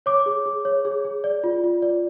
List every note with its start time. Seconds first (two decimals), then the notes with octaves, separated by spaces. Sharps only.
0.06 C#5 D6
0.26 G#4
0.46 G#4
0.65 C#5
0.85 G#4
1.04 G#4
1.24 D5
1.44 F4
1.64 F4
1.82 D5